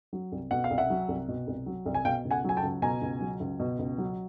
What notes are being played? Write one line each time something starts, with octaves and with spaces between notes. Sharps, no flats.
F#3
C2
B2 F#5
F5
C2
E5 F#5
F#3
C2
B2
C2
F#3
C2
G#5
B2 F5 G5
C#2
F#5 G#5
F#3 G#5
G5 A5
C#2
B2 G#5 A#5
C#2
F#3
C#2
B2
C#2
F#3